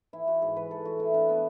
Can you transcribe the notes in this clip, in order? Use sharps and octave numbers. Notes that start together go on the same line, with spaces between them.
E3 E4
E3 F#4
G#2 G#4
E3 B4
E3 A4
A2 F#4
E3 E4
E3 D4
B3